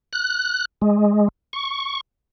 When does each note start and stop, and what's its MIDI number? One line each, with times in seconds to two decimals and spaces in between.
0.13 0.65 90
0.82 1.28 56
1.53 2.01 85